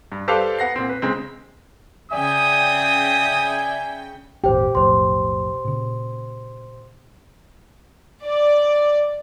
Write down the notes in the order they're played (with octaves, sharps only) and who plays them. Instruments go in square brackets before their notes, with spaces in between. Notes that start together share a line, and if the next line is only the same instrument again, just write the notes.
[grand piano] G2
G4 A4 B4 C5 D5 F5
B3 F#5 A#6 C7
A#2 C4
B4
C#3 G#3 C4
[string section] C#3 G5 [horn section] D5 E5 G#5 [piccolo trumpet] D#6
[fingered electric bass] G#1 E2 A#2 [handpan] G4 [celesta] C5 G5
[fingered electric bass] B1 F2 A2 [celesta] C5 C6
[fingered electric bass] A#2 C#3
[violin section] D5